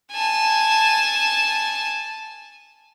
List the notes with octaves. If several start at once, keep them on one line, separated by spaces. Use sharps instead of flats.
G#5 A5